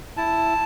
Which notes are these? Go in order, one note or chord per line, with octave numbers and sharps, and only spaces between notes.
E4 A5